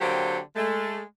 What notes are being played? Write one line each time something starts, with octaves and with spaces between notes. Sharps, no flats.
D3 F#3 A#3 C4 G4 C5
G#3 A3